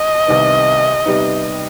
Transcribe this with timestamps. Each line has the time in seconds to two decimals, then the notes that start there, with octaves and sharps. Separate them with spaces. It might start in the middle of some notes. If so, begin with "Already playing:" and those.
Already playing: D#5
0.27 C2 C3 D#3 B3
1.06 C3 G3 B3 D#4